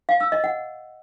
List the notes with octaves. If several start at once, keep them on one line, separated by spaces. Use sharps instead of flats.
F5
E6
D#5
F#5